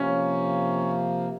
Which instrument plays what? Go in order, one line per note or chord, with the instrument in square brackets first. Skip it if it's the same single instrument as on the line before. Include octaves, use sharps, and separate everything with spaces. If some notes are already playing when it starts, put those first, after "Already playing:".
Already playing: [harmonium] C3 F3 A#3 [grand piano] C#4